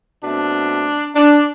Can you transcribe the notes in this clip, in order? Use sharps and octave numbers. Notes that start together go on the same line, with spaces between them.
B2 A3 C4 D4
D4